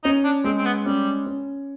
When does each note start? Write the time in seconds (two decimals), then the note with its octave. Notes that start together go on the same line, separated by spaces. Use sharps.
0.04 C#4 D#4
0.24 D4
0.44 G#3 C4
0.58 C4
0.65 B3
0.86 G3 C#4
1.26 C#4